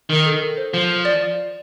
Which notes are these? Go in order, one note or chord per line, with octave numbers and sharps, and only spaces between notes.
D#3 A#4
A4
A#4
C5
F3 C5
D5